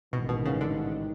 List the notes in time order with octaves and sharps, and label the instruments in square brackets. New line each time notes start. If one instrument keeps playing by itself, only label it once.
[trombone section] A1 G#2 D#3 [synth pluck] B2
[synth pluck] B2
C#3
D3